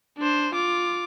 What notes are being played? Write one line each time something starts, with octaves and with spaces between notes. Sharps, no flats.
D4 C5
F4 D6